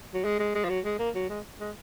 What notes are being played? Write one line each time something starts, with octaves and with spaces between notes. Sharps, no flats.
F#3
G#3
G#3
G#3
F3
F#3
G#3
A#3
F#3
G#3
G#3